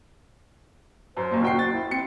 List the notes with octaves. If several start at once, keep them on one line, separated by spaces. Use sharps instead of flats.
F#2 C5
D#2 A#2
F#1 F#4 G5 C7
A6
E4
C4 C#7